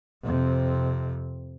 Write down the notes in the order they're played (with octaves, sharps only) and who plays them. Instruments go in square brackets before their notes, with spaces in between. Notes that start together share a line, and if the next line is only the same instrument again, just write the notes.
[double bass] F2 C3